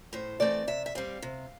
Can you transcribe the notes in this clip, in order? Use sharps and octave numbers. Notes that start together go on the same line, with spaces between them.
A2 C5
E3 A3 C4 D5
C3 E5
E5
G3 C4 F5
C3